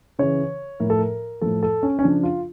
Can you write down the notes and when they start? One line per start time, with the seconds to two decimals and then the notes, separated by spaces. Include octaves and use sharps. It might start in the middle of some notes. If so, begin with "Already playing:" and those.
0.19 C#3 E3 C#5
0.80 A2 F3 A#4
0.90 A4
0.98 A#4
1.41 A2 F3 A4
1.63 A4
1.83 C#4
1.99 C#4
2.03 C#3 F3 D4
2.23 F4